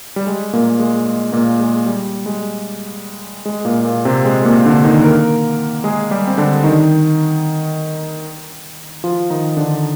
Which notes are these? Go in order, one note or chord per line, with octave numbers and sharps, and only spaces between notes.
G3
G#3
A#2 A#3
G#3
G#3
A#2 A#3
G#3
G3
G#3
G#3
A#2 A#3
A#2 A#3
C3 C4
G#3
A#2 A#3
D3 D4
D#3 D#4
A#3 A#4
G#3 G#4
G3 G4
C4
D3 D4
D#3 D#4
F3 F4
D#3 D#4
D3 D4